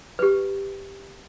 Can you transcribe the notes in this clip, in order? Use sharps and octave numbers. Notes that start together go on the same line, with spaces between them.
G4 B4